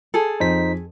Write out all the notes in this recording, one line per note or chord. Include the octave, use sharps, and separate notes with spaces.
G#4 A4
F2 D#4 C5 B6